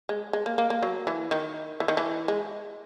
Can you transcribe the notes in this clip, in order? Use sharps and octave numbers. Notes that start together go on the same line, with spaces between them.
G#3
G#3
A#3
A#3
A#3
F#3
E3
D#3
E3
D#3
E3
G#3